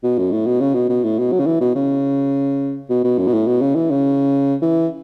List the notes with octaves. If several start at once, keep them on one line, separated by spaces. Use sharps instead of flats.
B2
F#2
A2
B2
C#3
B2
B2
A2
B2
F#3
C#3
E3
B2
C#3
B2
B2
F#2
B2
A2
B2
C#3
E3
C#3
E3